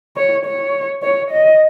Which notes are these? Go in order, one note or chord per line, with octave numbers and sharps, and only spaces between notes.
C#5
C#5
C#5
D#5